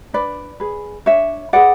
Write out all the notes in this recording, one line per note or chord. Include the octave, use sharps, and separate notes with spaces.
D4 B4 D5
G#4 B4
D4 C#5 E5
G#4 B4 D5 F#5